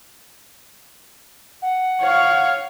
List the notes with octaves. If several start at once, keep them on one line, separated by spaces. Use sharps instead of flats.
F#5
C#5 F5